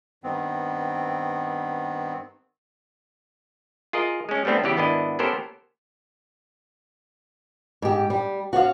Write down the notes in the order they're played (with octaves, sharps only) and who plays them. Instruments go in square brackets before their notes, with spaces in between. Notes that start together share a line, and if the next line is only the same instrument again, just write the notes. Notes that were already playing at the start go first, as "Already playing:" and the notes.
[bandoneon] G2 D#3 B3 C4
[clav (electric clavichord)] F4 G#4 A#4 D#5
G#3 C#4
G3 A3 B3 C4 D4
C#3 E3 B3 G4
G#1 B3 D4 E4 D#5
B3 C#4 G4 A4 A#4 C5
[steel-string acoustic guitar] G#2 G4
G3
F#4 C#5 D5 F5